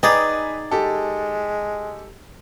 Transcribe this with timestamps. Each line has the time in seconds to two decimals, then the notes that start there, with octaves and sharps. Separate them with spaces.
0.03 D#4 G#4 B4 D5 G5 G#5 A#5
0.71 G#3 G4 A4